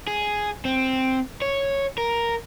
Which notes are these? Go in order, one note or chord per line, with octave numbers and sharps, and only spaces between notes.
G#4
C4
C#5
A#4